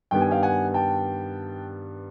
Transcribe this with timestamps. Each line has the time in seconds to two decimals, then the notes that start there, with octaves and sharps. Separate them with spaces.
0.11 G2 D#3 G3 B3 G5
0.21 G#5
0.31 F5 G5
0.43 F#5 G#5
0.74 G5 A5